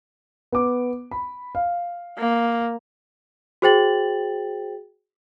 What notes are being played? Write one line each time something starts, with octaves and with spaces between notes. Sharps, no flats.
B3 D6
B5
F5
A#3
F#4 G#4 C5 G5 A6 F#7